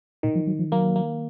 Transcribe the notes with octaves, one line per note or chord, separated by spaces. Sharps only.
A#2 D#3
F3
F#3
F3
F#3 A#3
A#3